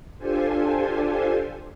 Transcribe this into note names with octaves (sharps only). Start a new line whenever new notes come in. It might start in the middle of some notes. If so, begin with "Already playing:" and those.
D4 F4 G4 A4 C5 G#5